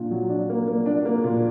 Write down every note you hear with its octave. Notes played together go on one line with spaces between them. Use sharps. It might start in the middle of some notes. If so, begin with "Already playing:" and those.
Already playing: A#2 D4
F#3
D4
A#3
A#3
D4
A#3
A#2